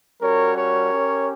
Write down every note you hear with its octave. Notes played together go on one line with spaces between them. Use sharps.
G3 C#4 F#4 A#4 C#5
A#4 C#5
C#4 G4